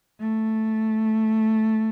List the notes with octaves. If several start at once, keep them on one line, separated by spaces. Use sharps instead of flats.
A3